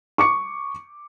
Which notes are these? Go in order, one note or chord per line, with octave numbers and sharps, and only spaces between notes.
C#6 D6 C#7